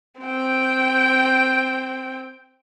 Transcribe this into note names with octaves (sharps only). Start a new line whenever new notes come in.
C4 G5